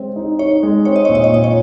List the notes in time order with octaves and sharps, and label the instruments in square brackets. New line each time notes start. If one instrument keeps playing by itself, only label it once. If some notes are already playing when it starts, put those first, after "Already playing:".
Already playing: [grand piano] G#3 C4
D#4
[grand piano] D#4 [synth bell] C#5
[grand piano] G#3
[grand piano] C4 [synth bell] C#5
[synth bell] D#5
[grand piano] A#2 [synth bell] C#5
[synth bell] D#5
C#5
[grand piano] A#2 [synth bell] D#5
[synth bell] C#5